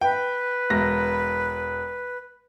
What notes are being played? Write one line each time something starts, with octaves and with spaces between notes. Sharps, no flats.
B4 G5
E1 A#6